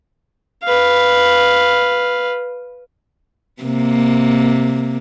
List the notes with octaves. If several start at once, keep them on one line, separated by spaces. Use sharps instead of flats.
B4 F5
C3 A#3